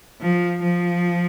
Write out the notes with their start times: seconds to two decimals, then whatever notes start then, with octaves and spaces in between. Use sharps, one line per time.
0.21 F3
0.63 F3